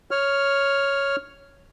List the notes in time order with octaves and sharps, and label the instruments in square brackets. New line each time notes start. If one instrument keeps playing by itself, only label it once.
[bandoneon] C#5 F6